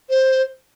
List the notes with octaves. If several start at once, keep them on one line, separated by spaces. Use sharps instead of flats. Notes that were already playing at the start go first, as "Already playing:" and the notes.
C5